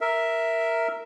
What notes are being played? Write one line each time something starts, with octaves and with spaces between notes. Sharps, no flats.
A#4 E5